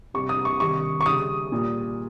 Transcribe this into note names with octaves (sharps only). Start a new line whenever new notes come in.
C3 G3 C#6
D#6
C#6
C3 D#3 G3 C#6
C#6
C#3 G3 D#6
A#2 G3